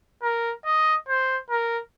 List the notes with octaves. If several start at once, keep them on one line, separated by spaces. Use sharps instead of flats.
A#4
D#5
C5
A#4